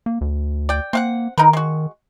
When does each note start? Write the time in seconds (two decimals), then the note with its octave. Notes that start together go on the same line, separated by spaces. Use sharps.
0.06 A#3
0.21 D2
0.69 D5 G5
0.93 A#3 C4 F5 F#5
1.38 D#3 D#4 A#4 B4
1.53 G#3 F#4